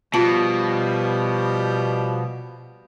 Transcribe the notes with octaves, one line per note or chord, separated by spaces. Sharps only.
B2 F3 G3 F4 A5